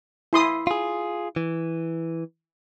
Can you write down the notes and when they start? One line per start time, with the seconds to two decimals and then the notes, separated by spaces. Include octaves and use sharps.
0.33 E4 C6 D#6
0.67 F4 G#4
1.36 E3